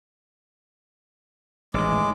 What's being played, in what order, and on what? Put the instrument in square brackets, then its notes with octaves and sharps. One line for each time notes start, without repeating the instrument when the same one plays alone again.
[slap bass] A1 D#3 [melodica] G#3 D6